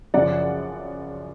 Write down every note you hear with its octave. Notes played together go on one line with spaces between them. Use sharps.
F#2 C#3 F3 D5 F#5